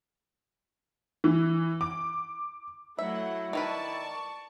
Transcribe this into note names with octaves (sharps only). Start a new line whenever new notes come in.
E3
D6
F#3 A3 E4 E5 F#5
D#3 A#4 B4 D5 A5 C#6